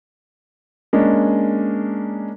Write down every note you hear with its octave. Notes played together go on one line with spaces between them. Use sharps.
G#3 A#3 C#4 D4